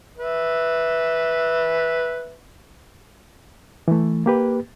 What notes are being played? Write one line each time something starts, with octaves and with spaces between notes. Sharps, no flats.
B4 E5
E3 A3
A#3 G4 B4